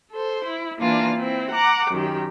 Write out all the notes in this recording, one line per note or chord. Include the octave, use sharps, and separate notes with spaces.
A4 C5
E4
E3 A#3 D4 F4
C4 E4
F#5 A#5 D6
F#2 D#3 G4